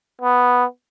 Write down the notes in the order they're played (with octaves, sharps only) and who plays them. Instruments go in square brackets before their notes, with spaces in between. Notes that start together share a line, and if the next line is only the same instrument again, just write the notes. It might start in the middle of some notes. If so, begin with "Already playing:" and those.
[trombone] B3